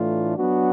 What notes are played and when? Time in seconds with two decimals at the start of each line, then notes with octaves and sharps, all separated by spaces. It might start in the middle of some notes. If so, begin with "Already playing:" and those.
Already playing: A2 E3 A3 D4 F4
0.38 F#3 B3 D4 F#4